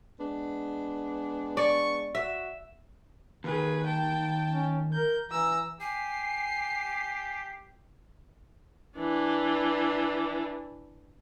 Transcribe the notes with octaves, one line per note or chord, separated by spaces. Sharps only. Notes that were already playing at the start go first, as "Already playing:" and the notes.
G#3 B3 D4
D5 C#6
F#4 E5
D#2 D#3 G#4 B4
G5 A5
C#4
A#4 G6
E3 A#5 E6
G4 G#5 C7
E3 D4